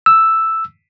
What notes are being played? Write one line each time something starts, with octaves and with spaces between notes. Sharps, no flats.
E6